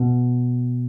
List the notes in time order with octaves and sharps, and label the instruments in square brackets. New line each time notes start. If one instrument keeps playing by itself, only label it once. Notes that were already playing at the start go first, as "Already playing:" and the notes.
Already playing: [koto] B2